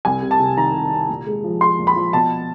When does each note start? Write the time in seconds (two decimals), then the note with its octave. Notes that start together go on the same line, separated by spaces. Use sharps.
0.05 C2 G#5
0.22 C3
0.31 A5
0.40 C3
0.57 D#3 A#5
0.74 C3
0.91 C3
1.09 A#2
1.27 G#3
1.44 F3
1.61 G#3 C6
1.79 A#2
1.87 B5
1.96 F3
2.13 B2 A5